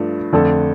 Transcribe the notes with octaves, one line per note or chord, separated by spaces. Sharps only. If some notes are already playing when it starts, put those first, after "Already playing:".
Already playing: G2 F3 A3 D4
F2 D3 A3 D4 A4